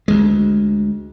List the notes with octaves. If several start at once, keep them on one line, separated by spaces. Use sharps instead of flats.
D2 G#3